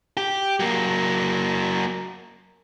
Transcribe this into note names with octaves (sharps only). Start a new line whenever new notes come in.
G4
F#3 A#3